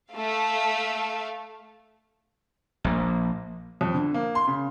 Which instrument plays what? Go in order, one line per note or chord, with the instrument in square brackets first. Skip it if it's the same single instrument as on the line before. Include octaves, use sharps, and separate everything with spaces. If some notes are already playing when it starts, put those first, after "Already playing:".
[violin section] A3 F5
[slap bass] A#1 A#3
[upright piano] F2
D3
A#3
C6
C#3